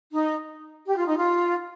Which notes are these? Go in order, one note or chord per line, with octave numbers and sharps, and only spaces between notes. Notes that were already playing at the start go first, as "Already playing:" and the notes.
D#4
G4
F4
D#4
F4